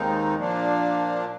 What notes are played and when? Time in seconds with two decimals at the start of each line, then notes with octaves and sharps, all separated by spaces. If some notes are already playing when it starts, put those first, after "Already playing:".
Already playing: D#2 D#3 G#3 C4 D#4
0.36 A#2 F3 A#3 D4